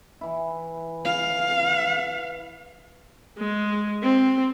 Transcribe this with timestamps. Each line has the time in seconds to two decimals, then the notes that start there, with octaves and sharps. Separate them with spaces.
0.21 E3 E4
1.05 F5
3.38 G#3
4.03 C4